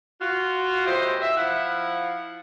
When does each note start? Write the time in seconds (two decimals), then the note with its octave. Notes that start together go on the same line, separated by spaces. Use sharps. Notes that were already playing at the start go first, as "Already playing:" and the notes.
0.22 F4 F#4
0.86 E2 A2 E3 G4 C5 D#5
1.22 E5
1.37 F3 E4 F5 F#5